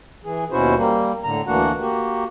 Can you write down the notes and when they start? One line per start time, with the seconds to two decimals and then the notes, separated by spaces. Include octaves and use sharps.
0.25 E3 G#4
0.52 D#2 B2 C#4 E4 F#4 C5
0.77 G3 A#3
1.24 A2 D3 A#5
1.47 D2 E3 A#3 D4 F#4 F#5
1.80 A#3 F#4 G4